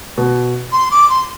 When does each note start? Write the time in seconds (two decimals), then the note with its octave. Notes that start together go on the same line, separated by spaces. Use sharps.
0.18 B2
0.72 C6
0.91 D6
1.09 C6